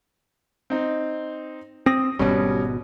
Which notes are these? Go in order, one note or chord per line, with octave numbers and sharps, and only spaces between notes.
C4 D#4
C4 D#6 A#6
G#1 B2 G3 C#4